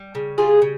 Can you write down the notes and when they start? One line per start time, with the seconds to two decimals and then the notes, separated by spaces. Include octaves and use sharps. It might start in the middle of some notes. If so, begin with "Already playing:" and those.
Already playing: G3
0.15 C#3
0.38 G3 F4 G#4
0.62 C#3